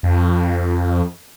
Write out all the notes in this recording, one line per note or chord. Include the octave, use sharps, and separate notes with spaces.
F2